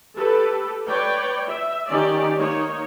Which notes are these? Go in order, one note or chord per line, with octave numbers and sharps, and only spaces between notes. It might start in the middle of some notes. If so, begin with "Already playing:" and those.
G4 A4 B4
B4 C#5 D5 G5
E5
D#3 C#4 D#4 G4 D5
A#3 D#4 C#5